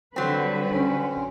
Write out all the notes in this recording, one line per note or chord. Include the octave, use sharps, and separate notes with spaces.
D3 F#3 G3 C4 B4
C#4